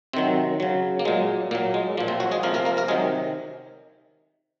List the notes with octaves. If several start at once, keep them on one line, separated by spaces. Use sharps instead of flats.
C3 D#3 F#3 C4
C#3 F#3
A#3
A#2 F#3 G#3
A#2 F#3 A#3
G#3
A#2 F3 A#3
C3 C4
F#3 F#4
G#3 G#4
C3 F3 A#3 A#4
A#3 A#4
A#3 A#4
A#3 A#4
C3 D#3 F#3 G#3 G#4